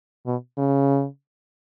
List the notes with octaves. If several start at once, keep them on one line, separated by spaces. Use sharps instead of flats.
B2
C#3